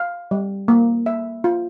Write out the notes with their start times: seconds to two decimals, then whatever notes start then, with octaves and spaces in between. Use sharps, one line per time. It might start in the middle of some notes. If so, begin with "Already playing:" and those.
Already playing: F5
0.31 G3
0.68 A#3
1.06 E5
1.44 F4